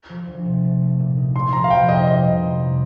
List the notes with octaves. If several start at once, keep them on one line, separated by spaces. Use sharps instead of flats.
F3
D2
C3
A3
A3
A#2
D#4
A#3 C6
F3 A#5
F5
C3 G5
F2 D#5
G3 D#5
C3
C4
G3